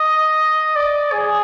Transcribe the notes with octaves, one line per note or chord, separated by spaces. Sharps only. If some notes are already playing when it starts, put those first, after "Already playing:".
Already playing: D#5
D5
G#4